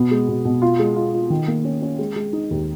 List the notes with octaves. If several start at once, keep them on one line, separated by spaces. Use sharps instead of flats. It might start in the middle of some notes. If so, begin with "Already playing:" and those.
Already playing: B2 B3
G#3
B2
B2
F4
G#3
F4
F4
D#3
A#3
C#4
C#4
G#3
G#3
D#4
D#2